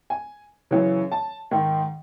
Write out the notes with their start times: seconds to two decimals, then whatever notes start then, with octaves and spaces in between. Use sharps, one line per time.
0.10 G#5
0.71 F#2 C#3 E3
1.12 A5
1.51 G#2 D#3